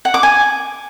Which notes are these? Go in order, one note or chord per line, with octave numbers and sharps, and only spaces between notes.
F#5
D6
G#5